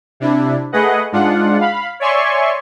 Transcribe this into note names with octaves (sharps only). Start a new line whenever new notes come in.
C3 D4 E4
A3 G#4 B4 D#5 F#5
G#2 G#3 D4 F4 F#5
F5 B5
C#5 D5 E5 G#5 C6 C#6